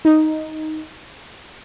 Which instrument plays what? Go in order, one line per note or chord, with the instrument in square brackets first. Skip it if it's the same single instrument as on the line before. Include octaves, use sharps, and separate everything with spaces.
[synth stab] D#4